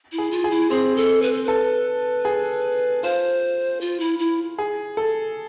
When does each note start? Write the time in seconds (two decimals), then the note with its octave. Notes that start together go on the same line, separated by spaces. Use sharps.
0.12 E4
0.18 G#4
0.31 F4
0.44 G#4
0.51 E4
0.70 C4 G#4
0.96 A4
1.22 B4
1.33 A4
1.44 A4 B4
2.25 G#4
3.03 F4 C5
3.81 F4
4.00 E4
4.19 E4
4.58 G#4
4.97 A4